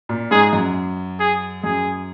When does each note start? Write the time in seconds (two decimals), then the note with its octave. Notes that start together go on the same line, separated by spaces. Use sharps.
0.09 A#2
0.31 G#2 G#4
0.53 F#2
1.20 G#4
1.63 F#2 G#4